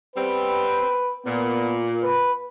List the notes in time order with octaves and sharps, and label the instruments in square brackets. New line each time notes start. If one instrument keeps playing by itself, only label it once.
[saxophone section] G3 B3 C4 [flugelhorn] B4
[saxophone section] A#2 [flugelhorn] B3
[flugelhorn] B4